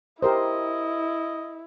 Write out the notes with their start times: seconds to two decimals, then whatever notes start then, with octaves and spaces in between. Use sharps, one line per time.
0.22 E4 G4 A#4 C5 D#5